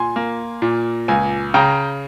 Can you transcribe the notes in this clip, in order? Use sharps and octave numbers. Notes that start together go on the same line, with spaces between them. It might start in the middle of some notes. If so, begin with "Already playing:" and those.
Already playing: A#2 G#5 C6
A#3
A#2
C#2 G#5
C#3 G5 A#5